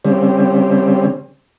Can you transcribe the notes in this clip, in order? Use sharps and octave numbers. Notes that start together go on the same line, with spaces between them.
C#3 G3 C4